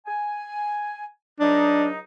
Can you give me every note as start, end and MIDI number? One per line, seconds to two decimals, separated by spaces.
0.06 1.04 80
1.40 1.99 37
1.40 1.99 54
1.40 1.88 62
1.40 1.99 63